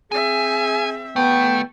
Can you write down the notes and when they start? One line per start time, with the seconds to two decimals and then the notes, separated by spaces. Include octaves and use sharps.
0.12 C4 G#4 E5 G#5
1.16 A3 B3 G5